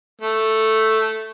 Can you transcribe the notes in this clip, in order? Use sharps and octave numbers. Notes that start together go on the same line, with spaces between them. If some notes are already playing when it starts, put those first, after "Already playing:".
A3